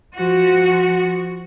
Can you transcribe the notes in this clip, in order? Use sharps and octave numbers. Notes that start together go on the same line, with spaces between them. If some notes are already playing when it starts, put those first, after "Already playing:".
F3 F#4